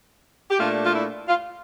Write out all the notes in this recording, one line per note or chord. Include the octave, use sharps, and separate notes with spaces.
G4
A#2 A3 D4 F4
F4
E4
F4